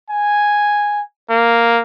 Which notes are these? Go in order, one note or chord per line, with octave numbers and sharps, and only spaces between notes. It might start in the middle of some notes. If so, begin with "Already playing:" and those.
G#5
A#3